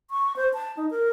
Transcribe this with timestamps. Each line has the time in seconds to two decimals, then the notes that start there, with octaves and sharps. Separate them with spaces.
0.10 C#6
0.36 C5
0.54 A5
0.77 D#4
0.91 A#4